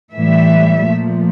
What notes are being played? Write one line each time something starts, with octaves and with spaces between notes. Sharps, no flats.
A2 E3 G3 E5
A#2 F3 A3